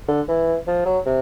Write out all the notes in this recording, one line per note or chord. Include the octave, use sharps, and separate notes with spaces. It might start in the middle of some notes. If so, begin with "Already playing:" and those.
D3
E3
F3
F#3
C3